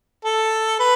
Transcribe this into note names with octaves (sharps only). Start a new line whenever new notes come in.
A4
B4